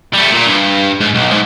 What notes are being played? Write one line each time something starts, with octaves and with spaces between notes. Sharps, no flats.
G3 A3
A#2
G2
G#2
B1
G#2